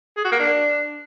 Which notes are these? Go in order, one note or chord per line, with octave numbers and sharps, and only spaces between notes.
G#4
F#4
A#3
D4